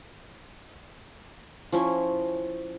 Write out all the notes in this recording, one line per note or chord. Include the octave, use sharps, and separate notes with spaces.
F3 C#4 E4